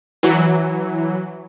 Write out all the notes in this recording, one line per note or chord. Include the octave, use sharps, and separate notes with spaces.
E3 F#3